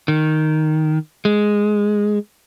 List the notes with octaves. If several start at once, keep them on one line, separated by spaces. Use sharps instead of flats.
D#3
G#3